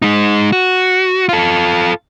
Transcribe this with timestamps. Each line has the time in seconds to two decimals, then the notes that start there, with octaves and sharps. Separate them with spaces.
0.02 G#3 D#4
0.52 F#4
1.29 F4 A4